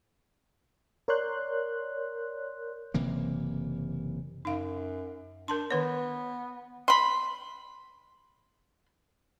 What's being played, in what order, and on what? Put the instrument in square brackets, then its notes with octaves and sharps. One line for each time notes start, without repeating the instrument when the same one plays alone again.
[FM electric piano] A#4 C#5 D5 C6 F#6 G6
[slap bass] F#1 C3 E3 A#3
[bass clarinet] F#2 [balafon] D#4 F5
[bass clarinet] D4 [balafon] A#4 A5 C6
[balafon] D#3 B4 C#5 [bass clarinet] B3
[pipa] B5 C6